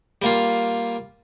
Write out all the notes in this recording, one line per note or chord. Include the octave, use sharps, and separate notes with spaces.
G3 A#3 F4